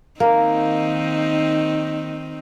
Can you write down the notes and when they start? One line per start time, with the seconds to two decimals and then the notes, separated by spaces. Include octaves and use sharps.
0.20 D#3 A#3 C4 D#4